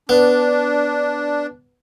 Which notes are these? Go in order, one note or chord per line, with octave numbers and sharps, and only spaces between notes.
B3 D4